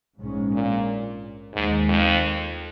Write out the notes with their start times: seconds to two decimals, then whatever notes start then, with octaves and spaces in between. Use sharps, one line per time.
0.19 A#1 G#2 G#3 C#4
0.53 A#2
1.54 D#2 G#2 D#3 G#3
1.89 F2